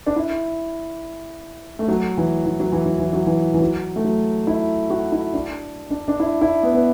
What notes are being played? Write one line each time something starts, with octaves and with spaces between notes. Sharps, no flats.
D4
E4
A3
F#3
E3
E3
F#3
E3
F#3
E3
F#3
E3
E3
F#3
A3
F#3
E4
F#4
E4
D4
D4
D4
E4
E4
B3
B3